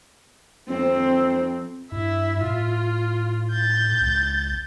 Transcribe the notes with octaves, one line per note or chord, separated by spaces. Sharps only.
F2 C4
G2 E4 E5
A2 F4
G6 A6
C#2